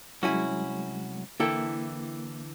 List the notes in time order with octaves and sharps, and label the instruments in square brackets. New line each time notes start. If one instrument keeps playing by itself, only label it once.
[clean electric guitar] C2 F#4 [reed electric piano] F#3 G#3 [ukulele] C#4 E4 G#5
[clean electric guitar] D3 E3 [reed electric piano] A#3 [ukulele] E4 A4 G5